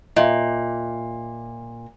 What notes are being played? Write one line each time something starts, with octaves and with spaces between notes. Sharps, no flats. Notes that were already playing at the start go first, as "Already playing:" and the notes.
A#2 D#5 E5